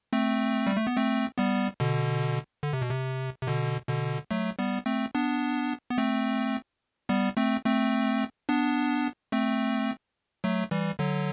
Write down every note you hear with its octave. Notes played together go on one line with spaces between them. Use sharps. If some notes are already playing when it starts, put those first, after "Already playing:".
A3 C4
G3
A3
B3
A3 C4
G3 B3
B2 D3
D3
C3
B2
C3
C3
B2 D3
B2 D3
F#3 A3
G3 B3
A3 C4
B3 D4
B3
A3 C4
G3 B3
A3 C4
A3 C4
B3 D4
A3 C4
F#3 A3
E3 G3
D3 F#3